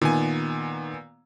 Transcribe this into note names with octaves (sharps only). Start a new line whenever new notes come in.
A#2 D#3 B3 G#5